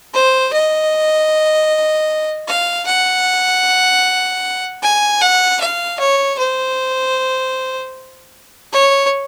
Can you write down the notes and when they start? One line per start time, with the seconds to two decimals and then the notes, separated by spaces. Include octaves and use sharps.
0.14 C5
0.53 D#5
2.48 F5
2.87 F#5
4.83 G#5
5.21 F#5
5.60 F5
5.99 C#5
6.38 C5
8.73 C#5